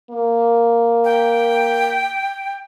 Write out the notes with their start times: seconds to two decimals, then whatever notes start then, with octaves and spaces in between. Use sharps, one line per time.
0.10 A#3
1.05 G5